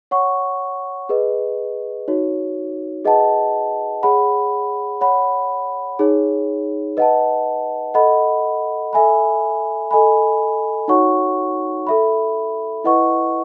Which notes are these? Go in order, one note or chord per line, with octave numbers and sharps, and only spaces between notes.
C#5 F#5 C#6
G#4 B4 D#5
D#4 F#4 C#5
G#4 B4 D#5 F#5 A5
G#4 C#5 F#5 B5
C#5 F#5 B5
D#4 G#4 C#5
B4 D#5 F#5 A5
A4 D#5 F#5 B5
A4 E5 G#5 B5
A4 D#5 G#5 B5
D#4 F#4 C#5 F#5 C#6
A4 E5 B5
E4 B4 D#5 F#5 C#6